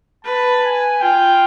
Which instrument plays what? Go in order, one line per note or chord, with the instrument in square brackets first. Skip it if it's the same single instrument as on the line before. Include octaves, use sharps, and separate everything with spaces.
[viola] B4 [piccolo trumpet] A5
[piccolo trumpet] G#5
[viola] F4 [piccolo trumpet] G5